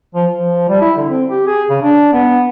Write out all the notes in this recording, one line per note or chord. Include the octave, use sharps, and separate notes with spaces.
F3
F3
G3
E4
D3
C4
G4
G#4
C#3
D4
B3